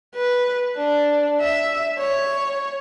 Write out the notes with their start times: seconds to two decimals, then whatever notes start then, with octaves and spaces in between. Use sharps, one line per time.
0.15 B4
0.77 D4
1.41 E5
1.98 C#5